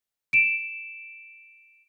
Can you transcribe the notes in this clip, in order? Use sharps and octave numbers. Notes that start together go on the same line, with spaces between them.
D7 E7